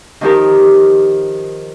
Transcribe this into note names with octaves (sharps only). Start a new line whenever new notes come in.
D#3 F3 D#4 G4 A#4